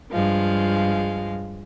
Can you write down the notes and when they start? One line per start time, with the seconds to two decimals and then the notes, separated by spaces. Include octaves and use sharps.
0.11 G2 F3 G#3 F5